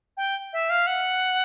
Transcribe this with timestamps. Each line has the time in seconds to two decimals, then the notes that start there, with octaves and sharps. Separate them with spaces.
0.17 G5
0.53 E5
0.70 F5
0.87 F#5